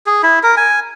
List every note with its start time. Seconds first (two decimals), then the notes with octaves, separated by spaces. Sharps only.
0.06 G#4
0.23 E4
0.43 A#4
0.57 G#5